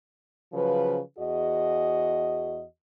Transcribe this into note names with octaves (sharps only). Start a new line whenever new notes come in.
C#3 F3 F#3 B4
E2 F#4 G#4 D#5